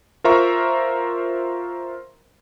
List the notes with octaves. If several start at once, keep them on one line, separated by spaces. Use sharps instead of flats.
F4 A#4 C5 E5 A#5 C#6